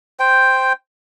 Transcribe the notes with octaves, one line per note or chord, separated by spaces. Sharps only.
C5 G5